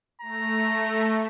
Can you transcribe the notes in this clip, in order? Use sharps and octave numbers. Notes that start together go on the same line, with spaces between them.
A3 A#5